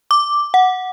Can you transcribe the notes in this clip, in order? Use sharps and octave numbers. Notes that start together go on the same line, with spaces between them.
D6
F#5